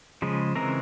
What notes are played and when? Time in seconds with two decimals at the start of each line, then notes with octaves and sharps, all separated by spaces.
0.22 C#3 F3 G#3
0.55 C#3 E3 G#3 C4 A#4 A#5